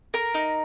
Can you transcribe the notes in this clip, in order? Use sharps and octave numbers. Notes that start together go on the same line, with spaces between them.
A#4
D#4